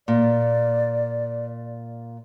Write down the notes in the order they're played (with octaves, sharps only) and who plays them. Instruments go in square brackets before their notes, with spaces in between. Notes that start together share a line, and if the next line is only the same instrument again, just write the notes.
[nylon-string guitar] A#2 [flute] D5